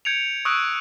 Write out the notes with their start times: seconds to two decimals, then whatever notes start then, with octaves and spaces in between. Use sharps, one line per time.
0.05 G6 G#6 C#7 D7 F7
0.45 C#6 D#6 E6 F#6 D7